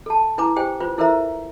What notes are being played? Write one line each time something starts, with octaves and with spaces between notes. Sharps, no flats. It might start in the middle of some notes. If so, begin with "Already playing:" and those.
A4 A5
E4 B4 G#5 A#5 D6
G4 C5 G5 G#5
F4 B4 C5
E4 A4 A#4 C5 E5 A#5